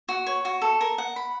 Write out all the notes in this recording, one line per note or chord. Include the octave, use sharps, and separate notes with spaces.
F#4
C#5
F#4
A4
A#4
F#5
B5